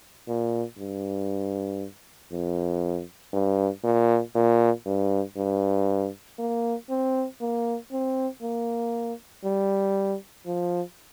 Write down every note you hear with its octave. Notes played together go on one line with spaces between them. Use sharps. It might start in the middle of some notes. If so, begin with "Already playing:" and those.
A#2
G2
F2
G2
A#2
A#2
G2
G2
A#3
C4
A#3
C4
A#3
G3
F3